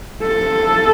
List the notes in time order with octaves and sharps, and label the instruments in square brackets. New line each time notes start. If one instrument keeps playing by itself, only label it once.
[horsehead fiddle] A4